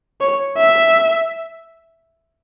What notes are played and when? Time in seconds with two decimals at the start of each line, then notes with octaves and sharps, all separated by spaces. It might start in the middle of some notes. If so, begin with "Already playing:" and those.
0.21 C#5
0.57 E5